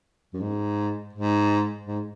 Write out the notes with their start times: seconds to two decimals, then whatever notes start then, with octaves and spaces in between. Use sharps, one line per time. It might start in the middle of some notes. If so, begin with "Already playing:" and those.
0.33 F#2
0.41 G#2
1.13 G#2
1.86 G#2